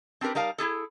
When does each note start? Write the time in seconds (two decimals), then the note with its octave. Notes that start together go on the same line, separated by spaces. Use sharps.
0.21 C4 D4 G4 A#4 B4
0.35 G3 D#4 A#4 F5 A5
0.58 E4 F4 G#4 A4